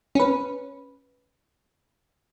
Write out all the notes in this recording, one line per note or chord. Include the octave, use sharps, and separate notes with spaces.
C#4 B4